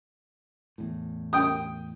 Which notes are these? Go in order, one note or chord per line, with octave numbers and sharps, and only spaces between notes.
E2 A2
G5 D#6